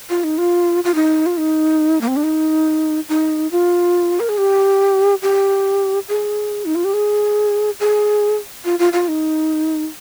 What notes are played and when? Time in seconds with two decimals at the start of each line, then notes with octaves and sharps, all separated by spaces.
0.10 F4
0.24 D#4
0.38 F4
0.84 F4
0.95 D#4
1.26 F4
1.38 D#4
2.01 A#3
2.08 C4
2.16 D4
2.23 D#4
3.09 D#4
3.52 F4
4.20 A#4
4.29 G#4
4.38 G4
5.22 G4
6.09 G#4
6.65 D#4
6.75 F4
6.85 G4
6.94 G#4
7.80 G#4
8.65 F4
8.79 F4
8.93 F4
9.08 D#4